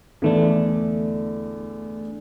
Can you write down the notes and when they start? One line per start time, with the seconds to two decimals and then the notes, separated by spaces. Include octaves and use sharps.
0.22 E2 D3 E3 A3 D4